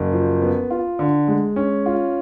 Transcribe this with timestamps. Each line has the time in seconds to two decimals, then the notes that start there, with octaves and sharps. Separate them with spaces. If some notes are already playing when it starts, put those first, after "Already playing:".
Already playing: F#1
0.13 F3
0.42 B3
0.70 F4
0.99 D3
1.28 G#3
1.56 C#4
1.86 F4